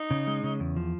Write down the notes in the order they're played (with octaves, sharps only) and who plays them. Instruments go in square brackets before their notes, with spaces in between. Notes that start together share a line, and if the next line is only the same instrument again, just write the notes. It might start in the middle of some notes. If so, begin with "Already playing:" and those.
Already playing: [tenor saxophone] D#4
[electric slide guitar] C#3
G#3
C#3
E2
F3